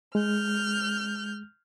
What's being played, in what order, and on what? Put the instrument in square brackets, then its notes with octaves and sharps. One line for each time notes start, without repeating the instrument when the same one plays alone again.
[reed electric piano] G#3 [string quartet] F6 G6